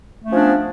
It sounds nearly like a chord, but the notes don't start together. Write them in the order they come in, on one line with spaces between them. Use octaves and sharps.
A3 C#4 F3 D4 B3